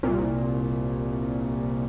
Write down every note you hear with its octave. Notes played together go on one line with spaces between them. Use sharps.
C2 A#2